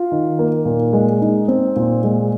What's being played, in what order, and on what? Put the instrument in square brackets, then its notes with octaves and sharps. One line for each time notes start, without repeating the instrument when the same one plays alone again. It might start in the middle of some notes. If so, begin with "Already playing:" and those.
Already playing: [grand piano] F4
D#3
A#3
A#2
G#3
D#4
C4
A#2
G#3